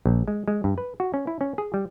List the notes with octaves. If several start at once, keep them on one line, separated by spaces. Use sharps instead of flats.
A#1
G#3
G#3
G2
B4
F#4
C#4
E4
C#4
G#4
G3